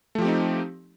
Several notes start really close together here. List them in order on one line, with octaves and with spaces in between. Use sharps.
A3 F3 G4 C4 D#4